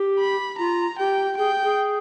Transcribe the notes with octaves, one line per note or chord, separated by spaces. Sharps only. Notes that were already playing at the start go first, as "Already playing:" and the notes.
Already playing: G4
B5
F4 A#5
G4 G5
G#4 G5
G#4